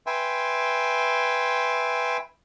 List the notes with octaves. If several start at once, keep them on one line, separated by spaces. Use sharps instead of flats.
B4 E5 G5 G#5 C6